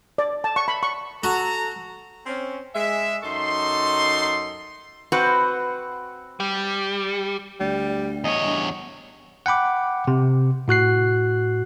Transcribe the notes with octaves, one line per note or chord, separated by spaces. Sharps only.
D5
A5
C#6
B5
C#6
F#4 A4 A#5
C4 C#4
G#3 E5
F#2 D#4 A4 C6
C4 F#4 B4
G3
D2 G3
E2 C#5 D#5
G2
F#5 G5 B5 D6
C3
A2 F#4 F#6 C7